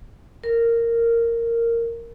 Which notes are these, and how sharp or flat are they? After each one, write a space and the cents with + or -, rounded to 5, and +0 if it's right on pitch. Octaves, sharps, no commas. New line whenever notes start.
A#4 -10